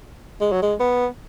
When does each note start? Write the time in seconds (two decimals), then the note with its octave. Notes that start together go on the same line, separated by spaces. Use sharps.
0.41 G#3
0.52 F#3
0.62 G#3
0.80 B3